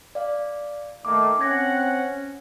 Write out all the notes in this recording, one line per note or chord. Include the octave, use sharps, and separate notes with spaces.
D5 F5
D#3 A3 A#3 D6
C4 C#4 F#5 G#6 A#6